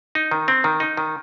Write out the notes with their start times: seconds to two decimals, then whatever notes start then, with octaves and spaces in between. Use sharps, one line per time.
0.15 D#4
0.31 D#3
0.48 C4
0.64 D#3
0.80 D#4
0.97 D#3